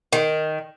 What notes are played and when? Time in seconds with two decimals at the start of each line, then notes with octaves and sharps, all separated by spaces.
0.13 D#3